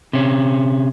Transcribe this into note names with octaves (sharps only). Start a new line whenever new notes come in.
C3 C#4